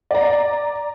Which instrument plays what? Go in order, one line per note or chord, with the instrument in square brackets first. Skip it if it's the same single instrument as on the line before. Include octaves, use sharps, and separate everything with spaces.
[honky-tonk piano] D5 A#5